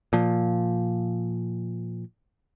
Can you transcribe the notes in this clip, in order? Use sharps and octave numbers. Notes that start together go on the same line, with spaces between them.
A#2 F3